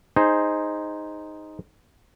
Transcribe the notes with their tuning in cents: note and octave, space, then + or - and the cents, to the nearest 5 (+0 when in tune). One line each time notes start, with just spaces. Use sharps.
D#4 +0 G#4 +0 C5 +0